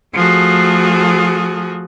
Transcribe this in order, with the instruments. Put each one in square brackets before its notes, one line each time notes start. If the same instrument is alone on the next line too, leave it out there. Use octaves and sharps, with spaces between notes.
[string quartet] F3 A3 F#4 G#4 A4